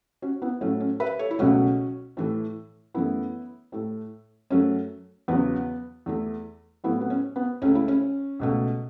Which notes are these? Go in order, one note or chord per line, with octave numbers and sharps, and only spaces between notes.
C#4 F#4
B3 E4
A2 F#3 A3 C#4
C#4
B4 E5
A4 C#5
E4
C#2 B2 F#3 A3 C#4 F#4
A2 E3 A3
F#2 E3 A3 B3 E4
A2 A3
F#2 F#3 A3 C#4
E2 C#3 F#3 B3
E2 E3 A3
A2 F#3 A3 B3 E4
B3
C#4
B3
C#2 C#3 A3 C#4
E4
C#4
C#2 B2 A3